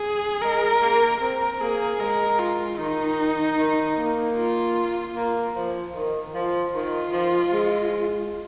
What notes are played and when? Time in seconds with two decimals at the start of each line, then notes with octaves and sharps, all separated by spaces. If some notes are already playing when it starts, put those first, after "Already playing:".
Already playing: G#4
0.42 G#3 A#4
0.81 A#3
1.21 C4 A#4
1.61 A#3 G#4
2.00 G#3 A#4
2.39 F4
2.78 D#3 D#4
3.58 D#3
3.97 A#3
4.36 F4
5.15 A#3
5.55 F3
5.94 D#3
6.34 F3
6.73 D#3 F4
7.12 F3
7.52 G#3